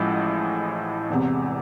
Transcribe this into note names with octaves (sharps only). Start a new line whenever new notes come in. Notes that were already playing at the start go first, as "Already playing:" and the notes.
Already playing: A1 A2 F3 G#3
E1 E2 C3